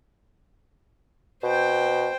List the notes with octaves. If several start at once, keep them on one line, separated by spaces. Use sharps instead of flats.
B2 C5 G5